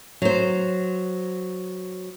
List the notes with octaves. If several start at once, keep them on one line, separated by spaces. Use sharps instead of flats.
F#3 C5